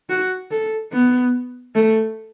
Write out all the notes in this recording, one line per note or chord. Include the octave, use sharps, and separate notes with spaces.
F#4
A4
B3
A3